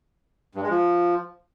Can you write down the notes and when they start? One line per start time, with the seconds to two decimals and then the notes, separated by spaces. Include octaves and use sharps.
0.55 G2
0.63 G#3
0.70 F3